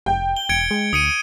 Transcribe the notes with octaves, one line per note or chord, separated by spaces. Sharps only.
F1 G5
G7
E1 G#6 C#7 D7
G#3
D2 D#6 C#7 D#7